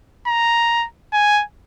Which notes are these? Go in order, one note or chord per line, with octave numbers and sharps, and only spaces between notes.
A#5
G#5